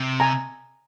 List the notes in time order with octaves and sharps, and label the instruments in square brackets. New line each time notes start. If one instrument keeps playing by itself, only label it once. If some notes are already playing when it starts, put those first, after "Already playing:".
Already playing: [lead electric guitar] C3
[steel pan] G#5 A#5